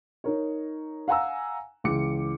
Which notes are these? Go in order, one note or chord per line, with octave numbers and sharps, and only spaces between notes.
D#4 A#4 C#5
F5 F#5 G#5 A#5 E6
C#2 E3 D6 C#7